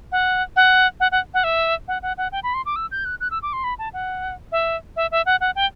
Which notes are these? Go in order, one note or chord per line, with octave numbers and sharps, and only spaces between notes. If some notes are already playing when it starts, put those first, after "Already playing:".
F#5
F#5
F#5
F#5
F#5
E5
F#5
F#5
F#5
G5
B5
C6
D6
E6
G6
F#6
F#6
E6
D6
C6
B5
A5
F#5
E5
E5
E5
F#5
F#5
G5